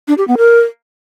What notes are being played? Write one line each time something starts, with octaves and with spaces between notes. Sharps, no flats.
D4
G4
B3
A#4